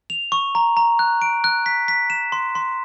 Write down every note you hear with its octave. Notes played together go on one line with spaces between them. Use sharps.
F7
C#6
A#5
A#5
F#6
D7
F#6
B6
B6
E7
C6
C6